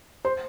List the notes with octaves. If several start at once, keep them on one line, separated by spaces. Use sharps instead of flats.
C5